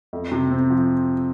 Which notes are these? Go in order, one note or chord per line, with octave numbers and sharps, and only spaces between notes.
F2
C3
C4
F3